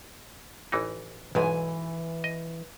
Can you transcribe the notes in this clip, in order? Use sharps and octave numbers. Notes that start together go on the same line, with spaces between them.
A1 E3 D#4
B1 G#2 E3 G#5
D#5